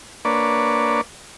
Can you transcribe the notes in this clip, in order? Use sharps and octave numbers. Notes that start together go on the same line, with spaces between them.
A#3 D4 B4 C#5 D5